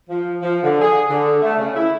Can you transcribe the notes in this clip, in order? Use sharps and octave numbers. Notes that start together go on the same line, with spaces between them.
F3
F3
D3
G#4
D3
A3
C#3
E4